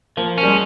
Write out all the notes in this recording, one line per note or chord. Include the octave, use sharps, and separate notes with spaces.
F3 A#3
C#4
G3
G#3